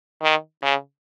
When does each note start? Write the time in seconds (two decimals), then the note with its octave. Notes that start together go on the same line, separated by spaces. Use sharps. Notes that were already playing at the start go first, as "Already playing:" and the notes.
0.23 D#3
0.62 C#3